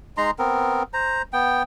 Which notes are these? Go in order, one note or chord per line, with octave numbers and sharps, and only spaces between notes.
G#3 D#4 A#5 C6
B3 C4 A#4
C5 A#5
B3 G5